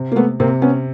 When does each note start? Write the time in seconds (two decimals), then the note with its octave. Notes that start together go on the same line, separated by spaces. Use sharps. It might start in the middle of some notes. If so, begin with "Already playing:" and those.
Already playing: C3
0.12 A#3
0.16 A3 B3
0.40 C3 A#3 C4
0.62 B3 C#4